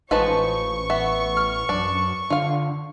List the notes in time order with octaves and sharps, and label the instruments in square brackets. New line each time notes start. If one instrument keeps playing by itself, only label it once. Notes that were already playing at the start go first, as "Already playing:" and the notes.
[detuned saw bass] A1 [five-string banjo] F3 G#3 D#4 [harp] B4 A5 [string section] C#6
[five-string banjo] B3 [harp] E5
[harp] F6
[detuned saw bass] F#2 [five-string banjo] D4
[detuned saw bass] D3 [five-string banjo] F4 F5